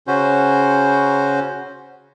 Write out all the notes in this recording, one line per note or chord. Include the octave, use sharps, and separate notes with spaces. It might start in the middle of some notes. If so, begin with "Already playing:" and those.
C#3 C#4 F#4 C5